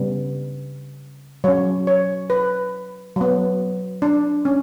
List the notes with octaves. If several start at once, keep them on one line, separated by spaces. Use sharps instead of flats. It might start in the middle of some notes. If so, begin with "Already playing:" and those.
Already playing: C#3 G3 B3
F#3 C#4 C#5
C#5
B4
F#3 B3
D4
C#4